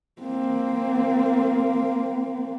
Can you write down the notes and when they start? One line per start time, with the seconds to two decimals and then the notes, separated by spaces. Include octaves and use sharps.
0.22 A#3 C4